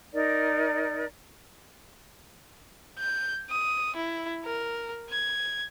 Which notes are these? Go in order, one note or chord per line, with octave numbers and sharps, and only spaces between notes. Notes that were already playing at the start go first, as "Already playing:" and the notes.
D#4 A#4 D5
G6
D#6
E4
A#4
G#6